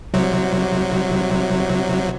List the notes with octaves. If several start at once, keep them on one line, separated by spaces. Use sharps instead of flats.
C2 C3 F#3